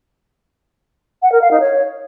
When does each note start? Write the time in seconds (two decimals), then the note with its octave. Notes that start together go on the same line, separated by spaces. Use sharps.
1.22 F#5
1.32 A#4
1.41 F5
1.51 D#4
1.60 C#5